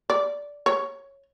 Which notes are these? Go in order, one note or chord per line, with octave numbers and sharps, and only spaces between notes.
D5
C#5